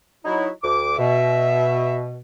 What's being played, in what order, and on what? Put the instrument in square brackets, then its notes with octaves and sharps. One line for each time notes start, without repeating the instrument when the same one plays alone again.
[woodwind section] F#3 D#4 E4
D2 D6
[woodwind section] B2 [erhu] E5